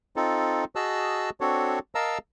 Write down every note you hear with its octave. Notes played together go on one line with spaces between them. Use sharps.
C4 D#4 F4 A4
F#4 G#4 D#5 A5 E6 F#6
C4 D4 F#4 A4 C#5
A#4 D#5 F5 A5 A#5 E6